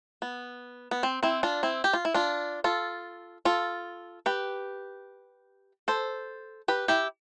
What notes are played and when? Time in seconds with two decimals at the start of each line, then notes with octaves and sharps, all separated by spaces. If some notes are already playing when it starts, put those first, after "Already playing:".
0.22 B3
0.91 B3
1.03 C4
1.23 C4 E4
1.43 D4 F4
1.63 C4 E4
1.84 G4
1.93 F4
2.05 E4
2.14 D4 F4
2.64 F4 A4
3.45 F4 A4
4.26 G4 B4
5.88 A4 C5
6.68 G4 B4
6.88 E4 G4